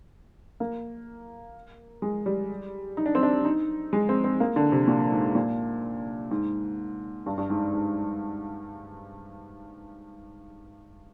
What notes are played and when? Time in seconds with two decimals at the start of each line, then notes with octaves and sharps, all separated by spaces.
0.60 A#3
2.02 G#3
2.26 G3
2.97 D#4
3.06 D4
3.15 C4
3.23 D4
3.45 D#4
3.93 G#3
4.09 C4
4.24 C4
4.40 A#3
4.56 D3
4.72 C3
4.88 A#2
5.12 G#2
5.35 A#2
6.31 G#2
7.26 G2
7.38 G2
7.50 G#2
7.73 G#2